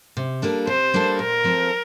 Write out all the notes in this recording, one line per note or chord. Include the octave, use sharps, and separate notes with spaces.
C3
G3 A#3 D4 A4
C3 C5
G3 A#3 D4 A4
A#2 A#4
F3 C4 F4 A4